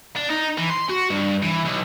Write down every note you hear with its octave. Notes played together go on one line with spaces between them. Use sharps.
D4
D#4
E3
C6
F#4
G2
E3
B1